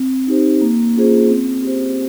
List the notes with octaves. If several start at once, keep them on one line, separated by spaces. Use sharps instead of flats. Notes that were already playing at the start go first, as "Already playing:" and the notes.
Already playing: C4
D#4 G4 C5
A#3
C#4 F4 G#4 C5
C4
G4 C5